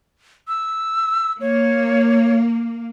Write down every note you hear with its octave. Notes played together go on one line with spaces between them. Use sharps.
E6
A#3 C#5